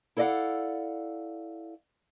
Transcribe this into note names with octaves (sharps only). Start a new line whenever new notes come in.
E4 A4 D5 D#5 F5 F#5